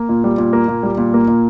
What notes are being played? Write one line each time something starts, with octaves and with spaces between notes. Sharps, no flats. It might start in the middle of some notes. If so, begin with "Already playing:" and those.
Already playing: A#3
A#2
G3
A#2
A#3
A#2
G3
A#2
A#3
A#2